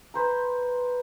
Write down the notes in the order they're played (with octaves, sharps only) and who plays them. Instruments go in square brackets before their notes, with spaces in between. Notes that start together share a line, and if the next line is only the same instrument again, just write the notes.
[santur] B4 C5 A#5